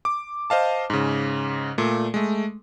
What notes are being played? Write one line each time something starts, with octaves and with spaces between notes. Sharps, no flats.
D6
C5 D#5 F5 A5
G#2 C#3
A#2 A3
G#3 A3